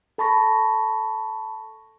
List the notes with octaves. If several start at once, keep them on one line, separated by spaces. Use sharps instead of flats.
A4 A5 B5 C#6 A#6